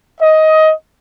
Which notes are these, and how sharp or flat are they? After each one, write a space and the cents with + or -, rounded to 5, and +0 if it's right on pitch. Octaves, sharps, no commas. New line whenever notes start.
D#5 +15